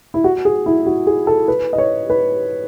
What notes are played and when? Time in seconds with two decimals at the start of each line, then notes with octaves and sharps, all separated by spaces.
0.14 E4
0.24 F#4
0.45 G#4
0.66 E4
0.86 F#4
1.07 G#4
1.27 A4
1.48 B4
1.73 D#5
1.78 C#5
2.10 B4